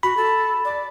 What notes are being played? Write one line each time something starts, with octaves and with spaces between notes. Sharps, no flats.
F#4 B5
A4
D5